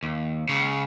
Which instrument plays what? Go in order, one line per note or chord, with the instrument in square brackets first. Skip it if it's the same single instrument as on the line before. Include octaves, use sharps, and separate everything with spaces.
[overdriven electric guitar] D#2
C#2 C#3